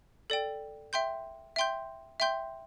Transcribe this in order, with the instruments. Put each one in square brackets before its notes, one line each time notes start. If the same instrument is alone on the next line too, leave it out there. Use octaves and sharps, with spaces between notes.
[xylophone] A4 D5 G5
E5 G5 C6 G6
E5 G5 C6 G6
E5 G5 C6 G6